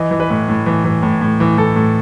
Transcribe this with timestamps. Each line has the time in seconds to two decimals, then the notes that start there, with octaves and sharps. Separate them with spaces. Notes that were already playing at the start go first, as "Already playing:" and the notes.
Already playing: E3 D#5
0.11 E3
0.20 B4
0.30 A2
0.49 A2
0.66 E3
0.84 E3
1.03 A2
1.21 A2
1.40 E3
1.58 E3 A4
1.76 A2